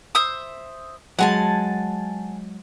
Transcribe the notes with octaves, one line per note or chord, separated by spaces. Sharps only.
C5 E5 D#6
F#3 G#3 F#5 G#5 A5